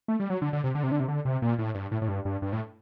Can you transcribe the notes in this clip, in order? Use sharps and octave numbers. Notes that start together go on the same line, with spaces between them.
A3
G3
F#3
D3
D3
C3
D3
C3
D3
C3
D3
C3
A#2
A2
G2
A2
A2
G2
G2
G2
A2